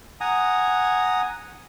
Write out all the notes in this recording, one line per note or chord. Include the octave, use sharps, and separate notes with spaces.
F#5 G#5 A#5 D#6